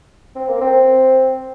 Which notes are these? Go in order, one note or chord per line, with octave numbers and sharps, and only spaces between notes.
C4
A#3
C4